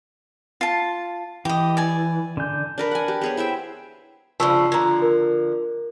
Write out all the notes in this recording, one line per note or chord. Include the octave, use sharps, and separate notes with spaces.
F4 A5
E3 G4 D#5
D5 G#5
D3 G6
D4 A#4 B4
F#5 G#5
G4
B3 G#4 C#5
E4 C5 E5 G5
G2 C#3 F3 A5 C#6 E6
D3 F3 A#5 G#6
A#4